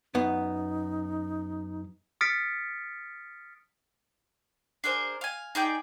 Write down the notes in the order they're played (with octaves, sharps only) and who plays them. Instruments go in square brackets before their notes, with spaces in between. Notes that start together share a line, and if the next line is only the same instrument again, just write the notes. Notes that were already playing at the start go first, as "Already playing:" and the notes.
[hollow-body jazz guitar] F#2 B3 [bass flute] D#4
[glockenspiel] D#6 F6 A6 B6 C#7 D7
[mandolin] D4 G#4 A#4 C5
F5 G#5
D#4 G#4 D5 G5